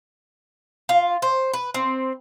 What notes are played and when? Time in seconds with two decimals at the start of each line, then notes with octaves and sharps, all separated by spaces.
0.89 F4
1.22 C5
1.53 B4
1.74 C4